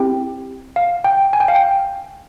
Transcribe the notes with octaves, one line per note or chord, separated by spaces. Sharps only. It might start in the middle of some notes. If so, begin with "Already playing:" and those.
Already playing: C4 E4 G4 G5
F5
G5
G#5
G5
F5
G5